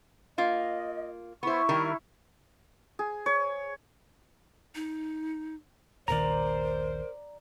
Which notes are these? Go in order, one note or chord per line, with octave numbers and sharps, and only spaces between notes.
A#3 F4 D#5
B3 E4 C5 C#6
D#3 G3 A#4
G#4
C#5
D#4
D#1 A#1 D#3 A#4 C5 D5 A#5